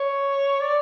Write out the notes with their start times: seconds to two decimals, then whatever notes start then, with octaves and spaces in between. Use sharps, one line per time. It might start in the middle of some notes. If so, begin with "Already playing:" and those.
Already playing: C#5
0.61 D5